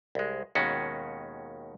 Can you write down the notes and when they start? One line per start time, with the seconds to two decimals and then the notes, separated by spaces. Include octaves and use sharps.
0.15 C2 G#3
0.55 D#2 B2 D#3 G#3 C#4 F#4